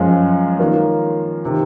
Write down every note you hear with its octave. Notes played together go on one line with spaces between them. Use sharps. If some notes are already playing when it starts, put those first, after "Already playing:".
Already playing: F#2 F3 G#3
D#3 A#3 F4
C3 D#3